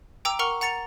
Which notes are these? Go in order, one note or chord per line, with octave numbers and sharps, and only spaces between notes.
G5 A#5 D6 E6 D7
A#4 F#5 A#5 C#6 F6
F#5 A#5 A6 C#7 F7